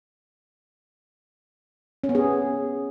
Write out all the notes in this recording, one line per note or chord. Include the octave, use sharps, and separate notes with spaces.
C#4
B3
G#4